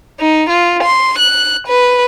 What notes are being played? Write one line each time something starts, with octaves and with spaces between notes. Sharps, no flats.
D#4
F4
C6
F#6
B4